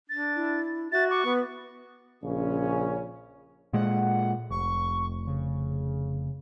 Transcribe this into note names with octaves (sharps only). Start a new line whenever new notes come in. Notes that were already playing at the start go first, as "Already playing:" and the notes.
D4 A6
E4
F#4 E5 A6
C#6 D6
B3 B4
A#1 C#3 C#4
A#2 G#3 F#5
F1 C#6
C#3